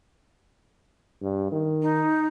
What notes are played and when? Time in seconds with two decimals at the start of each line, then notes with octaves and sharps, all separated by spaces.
1.22 G2
1.52 D#3
1.82 D#4